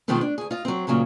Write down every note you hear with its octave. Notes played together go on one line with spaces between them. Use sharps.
B2 D#3 F3 G#3 A3 C4
D4
D2 G#4
F4 D#5
F#3 C4
D2 A#2 C#3 F#3